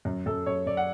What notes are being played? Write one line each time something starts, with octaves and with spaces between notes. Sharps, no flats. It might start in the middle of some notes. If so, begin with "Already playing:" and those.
F#2
F#2 A4
F#2 C#5
F#2 D5
F#5